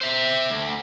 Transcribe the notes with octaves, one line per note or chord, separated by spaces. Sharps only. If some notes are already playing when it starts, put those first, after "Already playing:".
C5 E5
D2